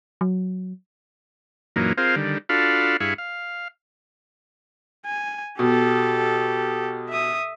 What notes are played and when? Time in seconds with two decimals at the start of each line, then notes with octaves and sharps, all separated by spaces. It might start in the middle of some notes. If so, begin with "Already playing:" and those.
0.21 F#3
1.76 F#2 A#2 E3 F#3 A#3 D#4
1.98 C4 F4 G#4 A#4 C5 F5
2.16 D3 D#3 G3
2.49 D4 F4 F#4 A4 F5 B5
3.00 G2 E4 G#4 F5 B5 C#6
3.18 F5
5.06 G#5
5.59 B2 G4 A4
7.10 E5 D#6